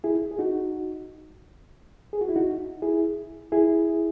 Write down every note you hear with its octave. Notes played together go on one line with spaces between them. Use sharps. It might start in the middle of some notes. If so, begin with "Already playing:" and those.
E4 G#4
G#4
D#4 F#4
G#4
F#4
E4
D#4 F#4
E4 G#4
E4 G#4